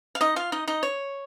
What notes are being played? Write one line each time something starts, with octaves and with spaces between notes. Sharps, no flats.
F5
D#4 D#5
F4 F5
D#4 D#5
D#4 D#5
C#5